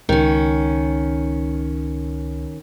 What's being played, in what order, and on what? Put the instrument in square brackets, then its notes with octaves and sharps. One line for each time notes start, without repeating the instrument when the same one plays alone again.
[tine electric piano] C#2 [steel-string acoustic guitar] D#3 C#4